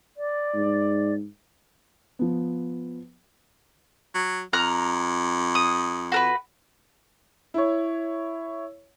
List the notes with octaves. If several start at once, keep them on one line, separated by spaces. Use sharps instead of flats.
D5
G#2
F3 B3
F#3
F2 A#5 F6 F#6
D#6
F#4 A#4 B4
E4 C#5